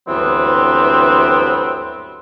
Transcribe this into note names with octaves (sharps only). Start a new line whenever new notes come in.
D2 G2 E3 F#3 B3 C4